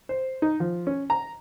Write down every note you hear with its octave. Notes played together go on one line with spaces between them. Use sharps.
C5
D#4
F3
C#4
A#5